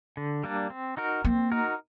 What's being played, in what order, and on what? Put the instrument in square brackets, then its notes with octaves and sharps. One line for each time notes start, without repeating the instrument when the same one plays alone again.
[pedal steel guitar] D3
G3 A#3 D4
C4
D#4 F#4 A#4
[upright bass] A#3 [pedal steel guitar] C4
[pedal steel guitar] D#4 F#4 A#4